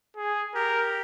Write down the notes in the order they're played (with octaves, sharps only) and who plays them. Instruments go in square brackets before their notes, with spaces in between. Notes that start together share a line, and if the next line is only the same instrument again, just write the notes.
[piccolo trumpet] G#4
[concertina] G4 [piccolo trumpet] A#4